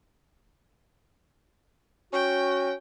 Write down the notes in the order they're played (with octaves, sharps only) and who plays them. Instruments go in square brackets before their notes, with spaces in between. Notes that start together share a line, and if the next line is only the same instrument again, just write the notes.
[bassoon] C#4 [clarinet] F#4 [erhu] G5